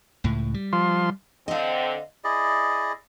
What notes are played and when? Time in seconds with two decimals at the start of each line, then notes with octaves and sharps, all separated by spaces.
0.24 C#2 A2
0.54 G3
0.73 F3 C6
1.48 D3 C4 D#5 F5
2.24 E4 G#4 D5 D#5